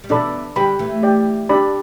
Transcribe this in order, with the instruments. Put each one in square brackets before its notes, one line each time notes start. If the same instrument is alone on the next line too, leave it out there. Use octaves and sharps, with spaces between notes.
[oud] G3
[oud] B2 E3 [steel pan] D4 A4 D5 B5
[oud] D3 G3 [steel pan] G4 B4 G5 B5
[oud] E3 A3
[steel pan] G4 D5 G5
D4 G4 D5 B5